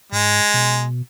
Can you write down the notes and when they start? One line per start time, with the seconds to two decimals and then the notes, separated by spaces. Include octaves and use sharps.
0.12 G#2 G#3
0.54 B2